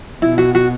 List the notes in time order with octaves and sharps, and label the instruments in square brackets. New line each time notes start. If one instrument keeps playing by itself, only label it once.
[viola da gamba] B2 [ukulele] E4
[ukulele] F#4
F#4